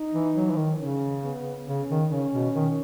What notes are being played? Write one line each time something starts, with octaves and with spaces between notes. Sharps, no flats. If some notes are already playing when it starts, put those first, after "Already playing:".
Already playing: D#4
E3
F#3
E3
D#3
C#3 C#4
B3
C#3 C#4
D#3
C#3 C#4
B2
D#3